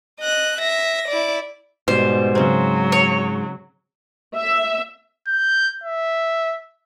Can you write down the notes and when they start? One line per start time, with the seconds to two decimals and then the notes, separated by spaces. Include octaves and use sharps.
0.20 D#5 F#6
0.59 E5 A#6
1.09 E4 D5
1.88 G#2 B2 G3 C5
2.35 C#3 F#3 C4
2.92 C#5
4.36 E5
5.27 G6
5.84 E5